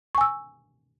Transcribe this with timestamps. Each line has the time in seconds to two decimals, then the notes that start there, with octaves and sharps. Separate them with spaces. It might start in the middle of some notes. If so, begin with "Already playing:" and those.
0.15 C#6
0.18 G#5
0.21 E6